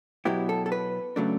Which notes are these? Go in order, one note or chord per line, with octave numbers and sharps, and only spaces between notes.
B2 F#3 B3 E4 G4
A4
A4
B4
C#3 F#3 A3 D4